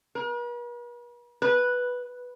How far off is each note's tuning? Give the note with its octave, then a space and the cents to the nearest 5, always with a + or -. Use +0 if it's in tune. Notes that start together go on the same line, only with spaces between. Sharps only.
B4 -45
B4 -5